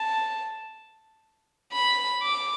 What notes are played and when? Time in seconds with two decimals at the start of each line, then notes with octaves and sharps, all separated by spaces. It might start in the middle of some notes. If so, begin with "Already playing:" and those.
Already playing: A5
1.72 B5
2.23 D6